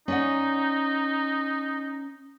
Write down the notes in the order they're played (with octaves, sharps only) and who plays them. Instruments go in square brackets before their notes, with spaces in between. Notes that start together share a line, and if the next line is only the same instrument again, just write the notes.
[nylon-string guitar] C#4 D5 F#5 [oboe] D#4